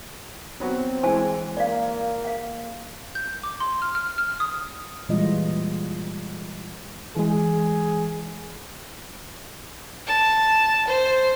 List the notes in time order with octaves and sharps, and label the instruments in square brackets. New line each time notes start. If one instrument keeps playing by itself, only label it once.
[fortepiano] F#3 B3 F#4 [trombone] C4
[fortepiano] E3 G#3 [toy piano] C5 G#5 A5
[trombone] A#3 [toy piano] D5 F5
[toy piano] F5 F#5
[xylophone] G6
D6
C6
F6
F6
F6
D#6
[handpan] A#2 E3 G3 G#3 F4 D#5
[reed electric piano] E3 G#3 [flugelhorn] G#4
[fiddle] A5
C5